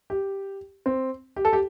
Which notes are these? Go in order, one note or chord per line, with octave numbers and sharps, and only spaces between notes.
G4
C4
G4
A4
G4